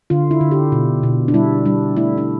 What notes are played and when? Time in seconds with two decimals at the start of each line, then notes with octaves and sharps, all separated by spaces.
0.10 D3 F4
0.31 E4
0.41 D3
0.51 G4
0.72 B2
1.03 B2
1.28 D4
1.34 G3 E4
1.66 G3 D4
1.97 A3 E4
2.18 D4